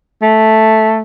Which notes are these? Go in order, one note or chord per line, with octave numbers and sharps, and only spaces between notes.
A3